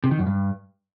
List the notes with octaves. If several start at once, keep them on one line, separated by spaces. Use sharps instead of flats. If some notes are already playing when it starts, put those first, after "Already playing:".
C3
D#3
F#2
G2